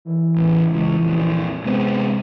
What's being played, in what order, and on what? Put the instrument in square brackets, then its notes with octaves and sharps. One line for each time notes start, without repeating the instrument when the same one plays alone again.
[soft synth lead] E3
[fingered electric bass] A1 E2
[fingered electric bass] C#2 [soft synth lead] E3
[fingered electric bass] A#1 F2
[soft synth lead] C3 [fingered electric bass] G#3 B3 C4